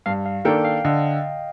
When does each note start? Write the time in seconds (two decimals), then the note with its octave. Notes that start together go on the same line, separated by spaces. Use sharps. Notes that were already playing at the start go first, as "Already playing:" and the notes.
0.06 G2 F5
0.26 F5
0.45 D#3 A#3 D4 A4 G5
0.65 F5
0.85 D3 D#5